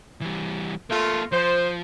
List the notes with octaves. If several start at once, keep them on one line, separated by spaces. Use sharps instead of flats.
E3 G3
A3 A#3 F4 A4
F3 C5